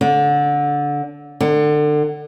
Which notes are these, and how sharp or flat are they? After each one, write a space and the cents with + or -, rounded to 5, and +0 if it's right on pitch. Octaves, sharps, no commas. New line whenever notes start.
D3 -15
D3 +30